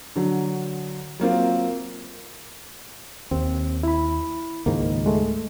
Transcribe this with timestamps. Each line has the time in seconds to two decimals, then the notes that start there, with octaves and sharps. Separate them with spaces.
0.16 D3 F#3
1.20 F#3 A#3 C4 F4
3.31 D#2 C4
3.83 E4 B5
4.66 C#2 G#2 D#3 A#3
5.06 G#3 A3